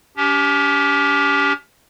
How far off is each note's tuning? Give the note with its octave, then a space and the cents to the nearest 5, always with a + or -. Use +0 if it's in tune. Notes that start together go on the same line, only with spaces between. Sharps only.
C#4 +40 G4 +0